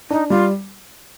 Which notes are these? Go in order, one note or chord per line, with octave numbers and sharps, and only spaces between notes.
D4 D#4
G3 F4